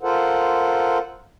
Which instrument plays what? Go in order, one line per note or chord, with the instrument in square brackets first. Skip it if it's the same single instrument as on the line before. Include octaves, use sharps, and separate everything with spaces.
[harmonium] F4 A4 A#4 C5 F#5